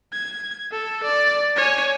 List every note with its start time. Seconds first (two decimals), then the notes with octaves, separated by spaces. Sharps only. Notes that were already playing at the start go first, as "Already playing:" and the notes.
0.13 G#6
0.72 A4
1.03 D5
1.57 C#5 G#5